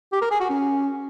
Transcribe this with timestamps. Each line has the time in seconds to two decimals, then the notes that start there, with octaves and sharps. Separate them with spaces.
0.12 G4
0.22 A#4
0.31 G#4
0.40 F#4
0.49 C#4